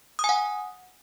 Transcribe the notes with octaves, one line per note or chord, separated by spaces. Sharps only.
D#6
G#5
F#5